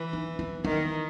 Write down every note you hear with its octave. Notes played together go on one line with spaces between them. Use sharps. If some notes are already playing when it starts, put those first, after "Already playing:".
Already playing: E3
D#4
E4
D#3 E4